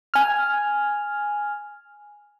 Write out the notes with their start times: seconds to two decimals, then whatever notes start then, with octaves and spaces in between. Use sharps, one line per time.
0.14 G#5 F6